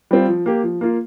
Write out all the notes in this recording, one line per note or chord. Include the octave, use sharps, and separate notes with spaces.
G3 C4 F4
F3
A#3 G4
F3
A#3 F4